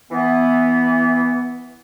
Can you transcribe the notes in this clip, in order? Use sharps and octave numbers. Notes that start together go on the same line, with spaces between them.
E3 B3